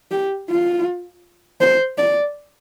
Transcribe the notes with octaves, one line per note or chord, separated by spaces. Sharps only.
G4
F4
C5
D5